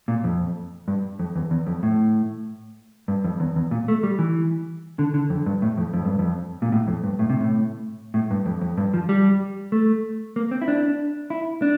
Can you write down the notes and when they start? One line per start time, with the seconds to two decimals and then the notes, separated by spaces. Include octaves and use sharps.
0.08 A#2
0.24 F2
0.88 G2
1.19 F2
1.36 E2
1.51 E2
1.67 F2
1.83 A2
3.08 G2
3.24 F2
3.40 E2
3.56 E2
3.71 A#2
3.88 A3
4.03 G3
4.19 E3
4.99 D3
5.14 D3
5.30 F2
5.46 G2
5.62 A2
5.78 F2
5.94 F2
6.05 G2
6.19 F2
6.62 A#2
6.72 A2
6.88 F2
7.04 G2
7.19 A2
7.30 C3
7.40 A2
8.14 A2
8.31 G2
8.46 F2
8.61 F2
8.78 G2
8.94 F3
9.09 G3
9.72 A3
10.36 A#3
10.51 C4
10.62 E4
10.68 D4
11.30 E4
11.62 D4